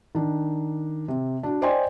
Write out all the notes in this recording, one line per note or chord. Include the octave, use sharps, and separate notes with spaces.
D#3 D4
C3
D4 F#4
C5 D5 D#5 G5 G#5 C6